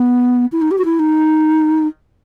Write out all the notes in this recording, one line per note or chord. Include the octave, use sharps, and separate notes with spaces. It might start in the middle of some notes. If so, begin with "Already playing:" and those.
Already playing: B3
E4
D#4
G4
F#4
E4
D#4